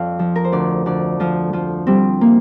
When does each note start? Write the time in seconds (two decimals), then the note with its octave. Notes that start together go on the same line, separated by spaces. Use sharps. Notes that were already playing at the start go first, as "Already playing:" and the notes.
Already playing: F2 D5 F5
0.19 F3
0.35 A#4
0.44 C5
0.52 D2 D5
0.86 D2 D5
1.20 F3 F4
1.53 F3 F4
1.87 G3 C4
2.21 A#3